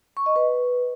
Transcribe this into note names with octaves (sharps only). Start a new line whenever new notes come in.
C#6
D#5
B4